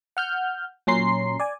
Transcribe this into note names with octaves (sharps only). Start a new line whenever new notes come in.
F#5 F6 G6
A#2 F#3 C#4 A#5 C6 C7
D5 G#5